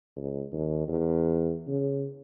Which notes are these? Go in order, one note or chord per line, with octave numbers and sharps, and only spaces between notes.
C#2
D#2
E2
C#3